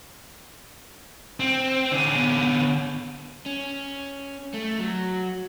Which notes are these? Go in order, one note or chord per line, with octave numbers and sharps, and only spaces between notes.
C4
D3 C#4
B3
B3
C#4
A3
F#3